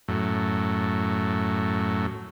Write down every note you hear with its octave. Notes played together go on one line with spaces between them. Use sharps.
F#2 A2